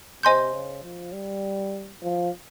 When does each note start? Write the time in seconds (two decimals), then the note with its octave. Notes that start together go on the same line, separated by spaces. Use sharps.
0.23 C3 C5 D#5 G#5 C6 G6
0.53 C#3
0.83 F3
1.13 G3
2.03 F3